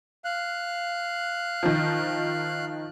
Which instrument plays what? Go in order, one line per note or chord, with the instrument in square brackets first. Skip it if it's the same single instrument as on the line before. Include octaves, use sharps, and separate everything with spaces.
[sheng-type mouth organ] F5 F#6
[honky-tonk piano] D#3 F3